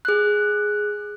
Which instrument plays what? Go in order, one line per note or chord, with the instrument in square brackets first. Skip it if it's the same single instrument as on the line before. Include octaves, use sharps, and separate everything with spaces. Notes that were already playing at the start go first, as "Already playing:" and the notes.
[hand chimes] G#4 F#6